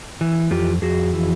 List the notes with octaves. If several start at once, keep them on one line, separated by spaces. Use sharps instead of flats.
E3
F2 F4 G4
F2 F#4 G#4
E3